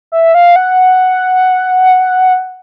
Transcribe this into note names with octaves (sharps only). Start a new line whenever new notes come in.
E5
F5
F#5